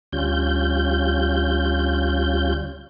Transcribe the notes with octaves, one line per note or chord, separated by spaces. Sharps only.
D2 G3 C#4 F4 G6